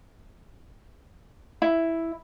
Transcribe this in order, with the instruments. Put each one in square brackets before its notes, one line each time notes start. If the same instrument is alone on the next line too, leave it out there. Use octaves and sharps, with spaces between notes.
[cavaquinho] E4